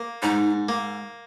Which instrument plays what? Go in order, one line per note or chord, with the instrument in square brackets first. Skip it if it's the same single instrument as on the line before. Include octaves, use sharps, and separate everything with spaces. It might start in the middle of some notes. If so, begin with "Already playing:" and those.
Already playing: [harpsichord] A#3
[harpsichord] G#2 [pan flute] D#4
[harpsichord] A#3